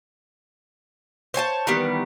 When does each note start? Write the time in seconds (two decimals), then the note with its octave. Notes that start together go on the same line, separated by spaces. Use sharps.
1.34 C5 C#5 G#5 A5
1.67 D#3 E3 G3 B3